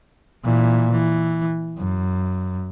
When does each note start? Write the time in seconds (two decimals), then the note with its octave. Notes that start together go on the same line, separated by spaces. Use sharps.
0.44 A#2 E3
0.92 E3
1.78 F#2